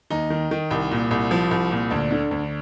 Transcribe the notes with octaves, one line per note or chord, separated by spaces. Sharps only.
D#2 D#4
D#3
D#3
C2
A#2
C2
F3
C2
A#2
D2 D4
D3
D2